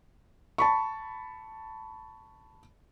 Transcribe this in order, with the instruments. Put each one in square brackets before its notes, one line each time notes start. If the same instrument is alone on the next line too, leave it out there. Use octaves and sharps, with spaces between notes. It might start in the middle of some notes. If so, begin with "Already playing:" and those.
[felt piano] A5 B5 C#6